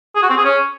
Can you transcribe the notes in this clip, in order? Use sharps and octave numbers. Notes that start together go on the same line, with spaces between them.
G#4
F#4
C4
G#4
C#4